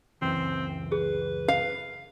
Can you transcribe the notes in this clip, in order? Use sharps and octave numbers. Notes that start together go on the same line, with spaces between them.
C#2 F#2 E3 C4
G#4 B4
F5